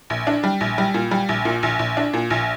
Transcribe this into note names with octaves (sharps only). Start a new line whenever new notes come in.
A#1
D4
G3
A#1
G3
A#2
G3
A#1
A#2
A#1
A#1
D4
A#2
A#1